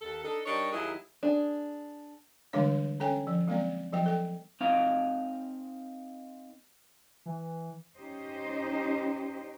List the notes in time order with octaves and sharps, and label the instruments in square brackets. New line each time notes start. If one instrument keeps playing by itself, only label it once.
[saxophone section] D#2 A4
D4 D#4 A4
G3 D4 D#4 A#4 C#5
D#2 F#3 D#4 E4 G#4
[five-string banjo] D4 G#4
[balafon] D3 E3 G3 G#3 D4 C#5
C#4 A4 C#5 G5 G#5
F3
F#3 G#3 A#3 C4 D5
F3 F#3 C5 G5
A4 G5
[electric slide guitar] C4 D#4 F5
[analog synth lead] E3
[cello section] C#4 D#4 G4 C5 D#5